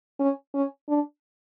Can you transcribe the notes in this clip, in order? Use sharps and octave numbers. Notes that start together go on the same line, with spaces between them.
C#4
C#4
D4